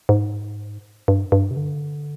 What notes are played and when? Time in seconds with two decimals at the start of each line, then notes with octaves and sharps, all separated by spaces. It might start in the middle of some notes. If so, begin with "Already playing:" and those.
0.09 G#2
1.08 G2
1.32 G2
1.51 C3
1.56 D3